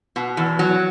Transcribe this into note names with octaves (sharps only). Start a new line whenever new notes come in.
B2
E2
F#3